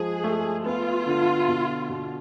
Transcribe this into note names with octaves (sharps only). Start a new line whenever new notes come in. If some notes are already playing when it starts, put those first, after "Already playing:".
Already playing: F3 G#3 G#4
A3
B3 F4
D3
B2
B2